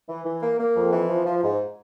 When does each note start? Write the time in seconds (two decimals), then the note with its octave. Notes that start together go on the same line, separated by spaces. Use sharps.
0.08 E3
0.24 E3
0.41 A#3
0.58 A#3
0.75 F2
0.92 E3
1.09 F3
1.26 F3
1.42 G#2